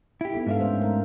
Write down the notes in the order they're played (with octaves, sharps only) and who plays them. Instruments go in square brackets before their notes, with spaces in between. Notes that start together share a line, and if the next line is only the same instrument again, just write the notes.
[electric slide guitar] E4 G4
[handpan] B3 D#4 A4
[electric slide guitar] G#2 E5 F5 [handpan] G#3 D4 A4
[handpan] A3 C#4 C5
A3 D#4 A#4